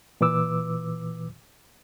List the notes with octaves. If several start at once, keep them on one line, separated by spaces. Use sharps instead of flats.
A#2 E3 B4 D6 E6